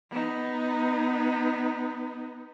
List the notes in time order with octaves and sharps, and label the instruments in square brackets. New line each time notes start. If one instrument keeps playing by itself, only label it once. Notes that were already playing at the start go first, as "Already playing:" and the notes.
[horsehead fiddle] B3 D#4